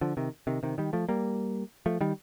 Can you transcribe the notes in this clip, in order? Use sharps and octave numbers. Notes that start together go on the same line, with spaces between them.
D3 F3
C3 D#3
C3 D#3
C3 D#3
D#3 G3
F3 A3
G3 A#3
F3 A3
D#3 G3